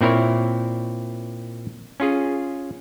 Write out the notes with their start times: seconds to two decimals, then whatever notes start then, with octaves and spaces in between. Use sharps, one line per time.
0.01 A#2 C4 E4 A#4 C#5
2.00 C#4 F4 G#4